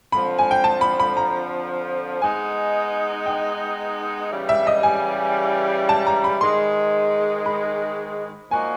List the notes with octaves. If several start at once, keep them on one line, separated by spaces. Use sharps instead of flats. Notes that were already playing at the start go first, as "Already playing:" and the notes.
F2 D3 F3 B5
G#5
G5
A5
B5
B5
A#5
G#3 B3 D#4 G#5
G5
C#3 E3 G3
E5
D#5
G#5
A5
A#5
B5
G#2 D#3 G#3 C6
B5
A#2 F3 A#3 D#4 F#4 G#5